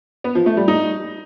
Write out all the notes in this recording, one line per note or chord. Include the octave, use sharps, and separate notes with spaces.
B3
F3
A3
G3
D#4